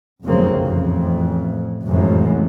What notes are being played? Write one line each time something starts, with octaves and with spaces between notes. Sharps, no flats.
F1 B1 F#2 C#3 A#3 C4
A1 F2
F1 C#2 F#2 A2 E3 F3